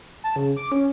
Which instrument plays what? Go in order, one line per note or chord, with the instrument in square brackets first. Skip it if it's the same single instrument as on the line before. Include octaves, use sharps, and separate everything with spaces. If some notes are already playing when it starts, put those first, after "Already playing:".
[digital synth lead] A5
C#3
D6
C#4